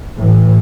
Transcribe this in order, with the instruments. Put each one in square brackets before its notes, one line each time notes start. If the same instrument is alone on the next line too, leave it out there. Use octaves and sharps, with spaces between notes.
[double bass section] A2 E3